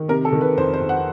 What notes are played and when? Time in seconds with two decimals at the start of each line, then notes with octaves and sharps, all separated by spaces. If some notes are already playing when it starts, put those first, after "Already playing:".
Already playing: D#3
0.08 C3 A#4
0.25 A4
0.33 D#3
0.41 B4
0.57 F2 C5
0.74 C5
0.81 F2
0.89 F#5